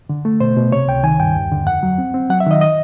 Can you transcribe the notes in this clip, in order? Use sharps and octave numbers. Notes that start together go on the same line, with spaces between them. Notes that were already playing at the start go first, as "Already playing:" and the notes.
D3
A3
B2 C5
B2
C3 C#5
C#2 G5
D#3 G#5
G2 G5
D#2
D3
F2 F#5
F#3
C4
C4
F#3 F#5
E5
D#3 D#5
D#5